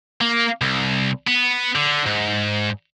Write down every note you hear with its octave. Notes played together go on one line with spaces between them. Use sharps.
A#3
C2
B3
D3
G#2